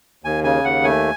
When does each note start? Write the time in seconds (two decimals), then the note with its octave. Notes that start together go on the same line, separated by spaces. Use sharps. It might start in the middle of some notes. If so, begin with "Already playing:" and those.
0.24 D#2 G#5
0.44 C#3 G#5
0.64 D#2 F#5
0.84 A3 G#5